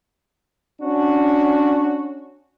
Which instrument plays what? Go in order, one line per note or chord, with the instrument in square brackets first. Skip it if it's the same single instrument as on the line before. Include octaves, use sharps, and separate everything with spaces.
[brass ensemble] C#4 D4 F#4